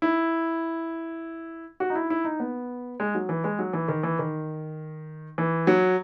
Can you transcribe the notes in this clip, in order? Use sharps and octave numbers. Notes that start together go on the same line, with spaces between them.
E4
F#4
D#4
E4
E4
D#4
B3
G#3
F#3
E3
G#3
F#3
E3
D#3
E3
D#3
E3
F#3